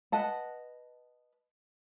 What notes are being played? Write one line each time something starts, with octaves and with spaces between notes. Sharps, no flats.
B4 D#5 F#5 A5